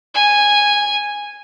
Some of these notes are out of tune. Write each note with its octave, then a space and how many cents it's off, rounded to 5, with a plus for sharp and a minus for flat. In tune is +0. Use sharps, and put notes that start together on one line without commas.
G#5 -10